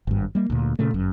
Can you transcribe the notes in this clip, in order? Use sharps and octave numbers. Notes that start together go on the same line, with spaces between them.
G#1 G2
G3 A#3
D2 A#2
A#2 C#3 A3
G1 F#2